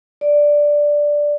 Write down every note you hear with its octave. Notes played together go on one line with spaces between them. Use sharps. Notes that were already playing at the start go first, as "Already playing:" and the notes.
D5